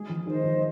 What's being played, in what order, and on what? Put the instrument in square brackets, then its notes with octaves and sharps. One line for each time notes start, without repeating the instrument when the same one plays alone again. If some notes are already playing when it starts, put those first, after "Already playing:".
Already playing: [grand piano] G#3 [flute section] G#4
[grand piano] F3
[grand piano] D#3 [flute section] C5 D#5
[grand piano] F3